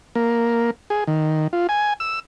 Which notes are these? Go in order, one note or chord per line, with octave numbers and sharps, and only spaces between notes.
A#3
G#4
D#3
F4
G#5
E6